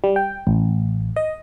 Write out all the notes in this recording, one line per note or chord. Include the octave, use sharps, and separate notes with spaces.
G3
G5
A1
D#5